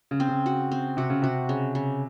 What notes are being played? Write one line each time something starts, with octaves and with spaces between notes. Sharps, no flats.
C#3
C4
C#3
F#4
C4
C3 F#4
C#3
C3 F#4
C#3
C#3